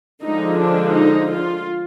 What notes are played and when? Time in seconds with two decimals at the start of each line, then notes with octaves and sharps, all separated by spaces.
0.24 D3 F3 G#3 D#4
0.58 D4
0.94 D#4
1.30 F4